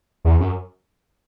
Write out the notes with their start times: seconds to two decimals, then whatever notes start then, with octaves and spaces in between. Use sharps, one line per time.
0.25 E2
0.40 F#2